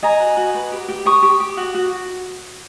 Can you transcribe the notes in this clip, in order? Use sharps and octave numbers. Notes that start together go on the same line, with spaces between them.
D#5 G#5 A#5
F#4
F#4
B4
G4
G4
G4 C#6 D#6
G4
G4
F#4
F#4